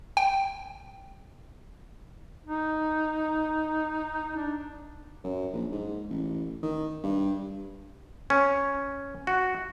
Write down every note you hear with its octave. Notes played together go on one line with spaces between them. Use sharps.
G5
D#4
D4
F#2
A#1
G#2
A1
D#3
G2
C#4
F#4